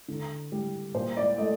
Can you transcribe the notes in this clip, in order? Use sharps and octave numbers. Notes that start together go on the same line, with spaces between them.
D3
G3
A#2 C5
D5
A3 D#5